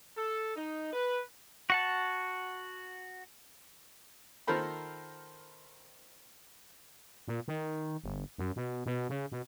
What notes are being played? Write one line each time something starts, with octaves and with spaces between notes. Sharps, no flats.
A4
D#4
B4
F#4 F#5 A5
D#3 F4 A4 A#4 C5 B5
A#2
D#3
G1
F#2
B2
B2
C#3
B2